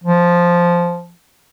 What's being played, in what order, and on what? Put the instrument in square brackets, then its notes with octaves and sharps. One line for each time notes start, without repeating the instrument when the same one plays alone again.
[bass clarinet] F3